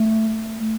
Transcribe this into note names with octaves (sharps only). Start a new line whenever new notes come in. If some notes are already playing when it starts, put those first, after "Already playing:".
Already playing: A3